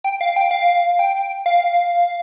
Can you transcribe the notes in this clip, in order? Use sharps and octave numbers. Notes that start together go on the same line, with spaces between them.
G5
F5
G5
F5
G5
F5